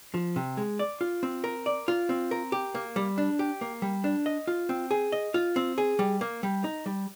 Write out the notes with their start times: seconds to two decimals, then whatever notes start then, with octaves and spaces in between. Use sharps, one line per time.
0.14 F3
0.36 C3
0.57 G#3
0.79 D5
1.01 F4
1.23 C4
1.44 A#4
1.66 D5
1.88 F4
2.09 C4
2.31 A#4
2.52 G4
2.75 A#3
2.96 G3
3.18 D4
3.39 G4
3.61 A#3
3.82 G3
4.04 D4
4.26 D#5
4.47 F4
4.69 C4
4.91 G#4
5.12 D#5
5.34 F4
5.56 C4
5.78 G#4
5.99 G3
6.21 A#3
6.43 G3
6.64 D#4
6.86 G3